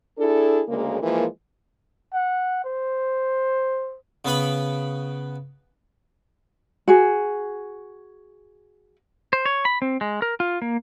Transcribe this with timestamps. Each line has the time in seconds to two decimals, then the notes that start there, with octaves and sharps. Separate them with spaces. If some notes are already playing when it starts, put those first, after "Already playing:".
0.18 D4 E4 G#4 A4
0.69 D2 C#3 G#3 A#3
1.02 E3 F3 G#3 A#3
2.14 F#5
2.65 C5
4.25 C#3 B3 B4 B5
6.88 F#4 G#4
9.33 C5
9.46 C#5
9.65 B5
9.82 C4
10.01 G#3
10.22 A#4
10.40 F4
10.62 A#3